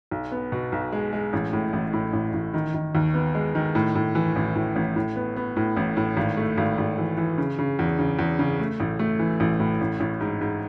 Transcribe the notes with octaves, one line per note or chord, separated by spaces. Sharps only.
B1
B3
B2
B1
G#3
G#3
A1
A2
A1
A2
A1
A1
D#3
D#3
D#2
B3
G#3
D#3
A2
A2
E3
A1
A2
A1
A2
B3
B3
A2
A1
A2
G#1
A3
G#1
G#1
E3
E3
C#3
C#3
E2
C#3
E2
C#3
A3
A1
A3
E3
A1
A2
A1
A1
G#2
G#2